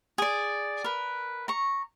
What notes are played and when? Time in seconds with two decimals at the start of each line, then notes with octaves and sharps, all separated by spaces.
0.18 G#4 D5
0.84 A#4 B4
1.48 A#5 C#6